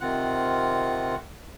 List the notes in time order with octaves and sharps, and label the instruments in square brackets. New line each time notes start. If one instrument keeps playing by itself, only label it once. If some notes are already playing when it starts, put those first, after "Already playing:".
[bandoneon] C3 D#3 C4 F4 F#5 F#6